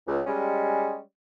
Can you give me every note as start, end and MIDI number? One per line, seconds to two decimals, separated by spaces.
0.07 0.21 37
0.26 0.97 55
0.26 0.97 56
0.26 0.97 61